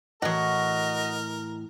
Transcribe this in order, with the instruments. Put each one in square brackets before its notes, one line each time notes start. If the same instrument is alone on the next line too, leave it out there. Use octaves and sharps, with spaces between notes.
[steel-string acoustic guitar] A2 E3 [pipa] F#3 F#4 [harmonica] A#4 [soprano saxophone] D#5